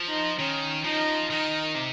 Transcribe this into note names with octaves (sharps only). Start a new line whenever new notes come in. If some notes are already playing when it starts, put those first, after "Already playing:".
Already playing: F3
D#4
D#3 C#4
F3 D#4
D#3 D#4
C3